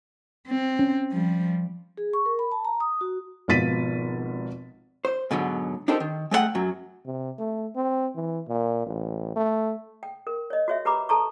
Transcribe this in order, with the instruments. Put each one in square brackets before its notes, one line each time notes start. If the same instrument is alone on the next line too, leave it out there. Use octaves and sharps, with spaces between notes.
[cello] C4
[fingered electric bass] C#4
[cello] F3 G3
[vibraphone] G#4
C#6
A#4
B5
A5
A#5
D#6
F#4
[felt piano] G#1 B2 F3 A6 B6 D#7
[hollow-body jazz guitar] C5
G#2 B2 D3 F#3
D4 D#4 G4 A4 A#4 C5
D#3
G#3 A3 B3 F#5 G5
F#2 F#3
[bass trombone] C3
A3
C4
E3
A#2
A1
A3
[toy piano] G5
A#4
C#5 D#5
F#4 C#5 E5
G4 B4 A#5 B5 D6
A4 A5 A#5 C#6